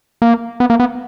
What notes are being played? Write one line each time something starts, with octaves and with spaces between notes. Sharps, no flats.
A#3
B3
A#3
B3